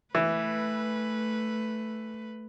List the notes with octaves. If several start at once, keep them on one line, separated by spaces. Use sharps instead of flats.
E3 A3 B4